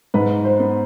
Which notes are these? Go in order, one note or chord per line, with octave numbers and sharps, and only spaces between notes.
G#2 B4
C5
B3